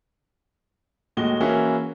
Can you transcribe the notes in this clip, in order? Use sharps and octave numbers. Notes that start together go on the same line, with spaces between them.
D#2 A2 G#3 F#4 D#5 G7
E3 A#3 C#4 E4 F#4 G#4